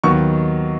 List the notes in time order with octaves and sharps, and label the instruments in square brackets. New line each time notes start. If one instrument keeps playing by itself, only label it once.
[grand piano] D#2 D#3 F#3 B3 C#6